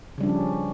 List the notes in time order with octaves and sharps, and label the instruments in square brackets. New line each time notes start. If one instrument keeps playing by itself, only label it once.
[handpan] C#3
G3
D4
F3
C#4